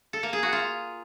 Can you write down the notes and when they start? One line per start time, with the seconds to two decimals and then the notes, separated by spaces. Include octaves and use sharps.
0.13 A4
0.23 A#3
0.33 G#4
0.43 F#4
0.53 F4